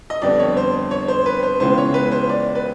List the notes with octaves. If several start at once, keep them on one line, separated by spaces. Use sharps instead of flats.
D#5
F2 D3 G3 B3 D4 D5
C#5
C5
C#5
C5
B4
C5
C#2 C#3 E3 G#3 B3 C5
C#5
B4
C5
D5
B4